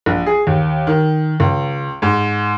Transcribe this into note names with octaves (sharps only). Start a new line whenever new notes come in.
A#1
G#4
D#2
D#3
C#2
G#2